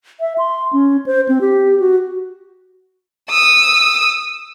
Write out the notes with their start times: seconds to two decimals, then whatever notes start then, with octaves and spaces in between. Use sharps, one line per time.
0.20 E5
0.38 C6
0.73 C#4
1.06 C5
1.29 C4
1.41 G4
1.80 F#4
3.30 D#6 E6